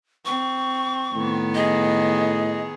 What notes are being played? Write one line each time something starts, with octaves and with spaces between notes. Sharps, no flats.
C4 C#6
A2 D#3 B3
G#4 D#5